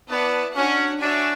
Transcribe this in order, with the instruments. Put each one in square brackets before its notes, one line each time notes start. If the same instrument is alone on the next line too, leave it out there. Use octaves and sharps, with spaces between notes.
[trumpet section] B3 [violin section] E4 B4 D5 A5
[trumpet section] C#4 [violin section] D4 F#4 C#5 F#5
[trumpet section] D4 [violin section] F#4 C#5 E5 G#5